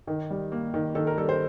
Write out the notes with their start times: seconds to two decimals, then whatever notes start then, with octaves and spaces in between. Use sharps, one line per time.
0.07 D#3
0.30 G3
0.52 A#3
0.74 D#3
0.95 D#3 A4
1.07 A#4
1.18 G3 A4
1.29 C5